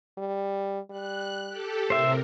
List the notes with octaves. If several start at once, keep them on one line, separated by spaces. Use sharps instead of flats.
G3
G3 F#6
G4 A4
A2 C3 A#4 C5 E5